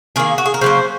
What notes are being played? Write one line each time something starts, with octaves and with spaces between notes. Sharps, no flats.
D#3 A#3 G#4
F#4
G#4
A#4
C#3 F#3 A#3 C5